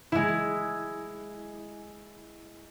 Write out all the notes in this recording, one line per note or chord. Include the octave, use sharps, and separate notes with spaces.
G#3 E4